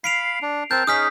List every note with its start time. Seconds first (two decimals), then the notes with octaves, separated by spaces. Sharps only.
0.04 F5 B5 C7 D7 F7
0.42 D4
0.71 C4 A#4 A5 G6
0.87 C#4 D#4 G#4 D#6 F6 B6